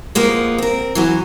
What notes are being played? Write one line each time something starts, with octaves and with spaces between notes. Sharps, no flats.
F2 F3 G#3 A#3 B3
C4 A#4
E3 F#3 C#4